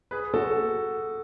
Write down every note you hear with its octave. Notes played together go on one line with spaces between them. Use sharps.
G#4 B4
F#4 A4